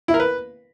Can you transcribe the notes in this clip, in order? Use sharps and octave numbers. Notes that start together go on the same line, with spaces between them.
E4
A#4
B4